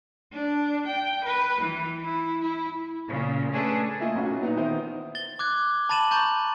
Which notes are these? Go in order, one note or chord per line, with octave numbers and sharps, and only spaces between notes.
D4
G5
B4
E3
E4
E4
A#2 C#3
A3 C#4 D4 G#4 A4 B4
A3 A#3 E4 F4 D#5 G#5
B1 C#4 F#4
A#2 B3 D#4
D#3 E3 D#4 E4 A#4 C5
A6 G7
D6 F#6 G#6
A5 B5 A6 D#7 E7 F#7
A#5 C#6 G6 A6